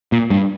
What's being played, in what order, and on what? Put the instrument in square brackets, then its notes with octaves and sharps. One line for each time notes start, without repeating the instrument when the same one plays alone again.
[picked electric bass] A#2
G2